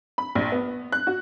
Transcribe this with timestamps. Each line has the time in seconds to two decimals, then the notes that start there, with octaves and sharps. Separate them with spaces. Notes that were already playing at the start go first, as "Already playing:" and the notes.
0.18 B5
0.35 A#1
0.52 B3
0.92 F#6
1.07 F#4